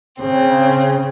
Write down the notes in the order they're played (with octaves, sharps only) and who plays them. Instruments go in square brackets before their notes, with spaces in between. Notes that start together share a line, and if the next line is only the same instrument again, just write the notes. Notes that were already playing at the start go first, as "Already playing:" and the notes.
[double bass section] C#3 [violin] C4